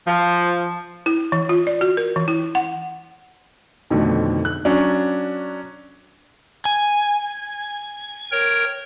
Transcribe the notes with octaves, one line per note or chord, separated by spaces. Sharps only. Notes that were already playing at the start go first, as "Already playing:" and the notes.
F3
E4
E3
F4
D5
F#4
A#4
E3
E4
F#5
F2 B2 D3 D#3 A3
F#6
F#3 C#4 D4
G#5
A#4 C#5 G5